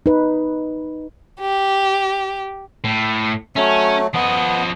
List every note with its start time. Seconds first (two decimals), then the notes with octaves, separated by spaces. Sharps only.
0.06 D#4 B4
1.40 G4
2.84 A2
3.56 F#3 A3 C#4
4.14 F3 B3 D#5